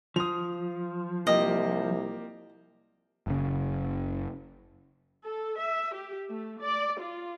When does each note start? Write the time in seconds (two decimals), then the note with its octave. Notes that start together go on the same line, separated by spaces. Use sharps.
0.16 F3 D#6 F7
1.27 C2 A#3 F4 G4 D#5
3.27 F#1 C#3
5.24 A4
5.59 E5
5.94 G4
6.30 A3
6.62 D5
7.01 F4